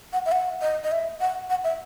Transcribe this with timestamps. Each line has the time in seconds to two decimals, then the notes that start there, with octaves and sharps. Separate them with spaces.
0.13 F#5
0.26 E5
0.32 F#5
0.61 D#5
0.84 D#5
0.92 E5
1.21 F#5
1.50 F#5
1.64 E5